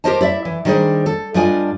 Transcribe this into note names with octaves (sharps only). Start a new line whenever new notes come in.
G4 A4 A#4 C5 D#5 A5
E4 D5 E5
E3
D#3 G3 D4 G#4 C5
A4
G2 G3 D4 F4 D#5 G#5